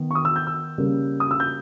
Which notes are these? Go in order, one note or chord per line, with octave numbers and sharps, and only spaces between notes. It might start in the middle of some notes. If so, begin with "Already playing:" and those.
Already playing: D#3 B3
C#6
D#6
E6
G6
E6
C#3 G3 A#3
D#6
E6
G6